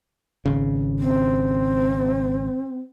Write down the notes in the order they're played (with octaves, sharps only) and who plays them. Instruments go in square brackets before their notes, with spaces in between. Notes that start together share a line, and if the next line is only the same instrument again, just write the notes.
[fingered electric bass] G#1 C#3
[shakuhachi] C4